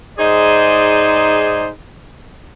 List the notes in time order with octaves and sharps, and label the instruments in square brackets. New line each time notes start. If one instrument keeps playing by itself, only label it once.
[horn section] G#2 D#4 G#4 C5 D5